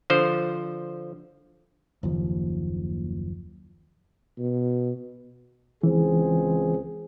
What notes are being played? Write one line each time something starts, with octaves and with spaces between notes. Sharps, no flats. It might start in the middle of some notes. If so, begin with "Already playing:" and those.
D3 F3 C5
F#1 D#2 F3
B2
C#2 E3 C4 G#4